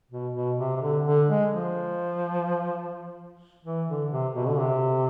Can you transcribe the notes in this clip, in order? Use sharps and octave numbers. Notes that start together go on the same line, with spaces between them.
B2
B2
C3
C3
D3
D3
G#3
F3
E3
D3
C3
B2
D3
C3